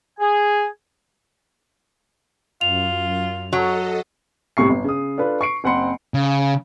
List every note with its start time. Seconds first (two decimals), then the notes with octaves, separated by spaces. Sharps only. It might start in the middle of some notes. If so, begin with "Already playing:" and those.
0.20 G#4 G#5
2.61 F#2 F4 F7
3.53 F#3 A4 D#5
4.57 C2 A2 C3 C#6 C7
4.70 G1
4.84 C#3 D#6
5.18 D4 F4 A4 B4
5.41 C#6 C7 D7
5.64 F#1 C4 F#5 B5 C6 C#7
6.14 C#3